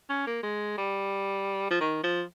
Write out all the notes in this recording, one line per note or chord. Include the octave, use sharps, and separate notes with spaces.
C#4
A#3
G#3
G3
F3
D#3
F3